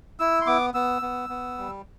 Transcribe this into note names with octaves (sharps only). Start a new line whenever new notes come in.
E4 E6
C6
B3 D6
B3 E6
B3
B3
G3